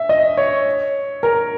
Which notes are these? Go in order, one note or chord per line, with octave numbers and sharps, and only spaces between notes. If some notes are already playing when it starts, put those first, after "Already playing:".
Already playing: E5
D#5
C#5
A#4